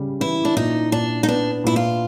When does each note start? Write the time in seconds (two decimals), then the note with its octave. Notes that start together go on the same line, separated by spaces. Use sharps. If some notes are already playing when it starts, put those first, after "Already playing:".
Already playing: C#3 G3
0.20 E3 E4
0.45 D4
0.56 A#2 D#4
0.92 A#2 D4
1.23 D#4
1.28 B3 D4
1.64 A#2 E4
1.76 F4